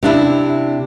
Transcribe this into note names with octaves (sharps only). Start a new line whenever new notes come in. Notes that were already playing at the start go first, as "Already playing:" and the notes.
C3 D4 E4